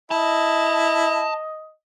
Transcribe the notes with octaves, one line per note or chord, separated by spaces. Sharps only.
E4 D#5 A5